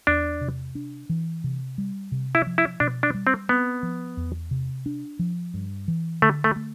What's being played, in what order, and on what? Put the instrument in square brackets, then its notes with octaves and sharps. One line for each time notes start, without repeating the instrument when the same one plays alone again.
[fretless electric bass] E2 [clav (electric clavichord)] D4
[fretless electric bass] C3
D4
E3
C3
G3
C3
[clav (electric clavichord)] E4
[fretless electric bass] F3
[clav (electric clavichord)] E4
[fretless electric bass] B2 [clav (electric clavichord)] D4
[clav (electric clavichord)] D4
[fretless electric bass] G3
[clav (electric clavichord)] C4
[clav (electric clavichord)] B3 [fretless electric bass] C4
[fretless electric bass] F3
E2
C3
D4
F3
G2
E3
[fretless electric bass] D3 [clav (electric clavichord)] A3
[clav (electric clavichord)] A3
[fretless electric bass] A3